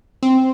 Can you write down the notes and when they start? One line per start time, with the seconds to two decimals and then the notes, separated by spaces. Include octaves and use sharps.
0.23 C4